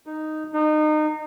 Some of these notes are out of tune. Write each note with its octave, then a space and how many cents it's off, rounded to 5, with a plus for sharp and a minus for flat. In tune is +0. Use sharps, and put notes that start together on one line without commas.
D#4 -5
D#4 -25